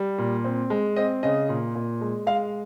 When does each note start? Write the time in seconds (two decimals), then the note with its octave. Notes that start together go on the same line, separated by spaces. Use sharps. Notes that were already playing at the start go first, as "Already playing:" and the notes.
Already playing: G3
0.18 A#2
0.44 C4
0.70 G#3
0.96 C4 D#5
1.23 C#3 D#5
1.49 A#2
1.76 A#2
2.01 G#3
2.27 G#3 F5